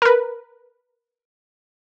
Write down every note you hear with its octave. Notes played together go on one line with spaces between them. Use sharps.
A#4 B4